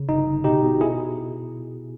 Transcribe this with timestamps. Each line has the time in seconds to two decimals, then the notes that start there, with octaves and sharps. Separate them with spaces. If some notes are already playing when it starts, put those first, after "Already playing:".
Already playing: C#3
0.09 G1 D#4
0.27 G1
0.44 B2 D#4 G4
0.63 B2
0.81 E4 G#4